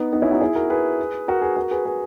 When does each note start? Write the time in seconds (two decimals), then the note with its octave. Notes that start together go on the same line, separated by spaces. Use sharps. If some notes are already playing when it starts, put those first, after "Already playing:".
Already playing: B3 D#4
0.13 B3 D#4
0.22 C#4 E4
0.31 D#4 F#4
0.41 E4 G#4
0.55 F#4 A#4
0.70 G#4 B4
1.28 F#4 A#4
1.42 G#4 B4
1.57 F#4 A#4
1.71 G#4 B4
1.85 G#4 B4